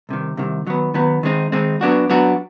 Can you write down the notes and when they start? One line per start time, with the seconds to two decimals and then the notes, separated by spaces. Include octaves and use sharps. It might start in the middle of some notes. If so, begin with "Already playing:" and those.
0.09 C2 C3 D#3
0.37 C2 C3 D#3
0.67 D#3 F#3 B3
0.94 D#3 F#3 B3
1.23 D#3 G#3 C4 D#4
1.52 D#3 G#3 C4 D#4
1.81 F#3 B3 D4 F#4
2.10 F#3 B3 D4 F#4